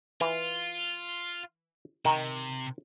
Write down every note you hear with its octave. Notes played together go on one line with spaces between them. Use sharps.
E3 F4
C3 D#3 A#5